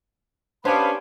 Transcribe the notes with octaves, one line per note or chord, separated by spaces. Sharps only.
B3 C#4 D4 G4 C5 F5 A5 B5